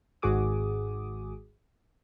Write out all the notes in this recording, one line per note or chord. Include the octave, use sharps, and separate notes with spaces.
G#1 G#2 F#4 G#4 D6 D#6